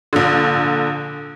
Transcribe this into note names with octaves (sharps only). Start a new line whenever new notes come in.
A#1 D3